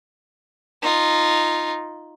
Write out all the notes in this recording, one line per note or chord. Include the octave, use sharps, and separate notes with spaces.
D#4 F4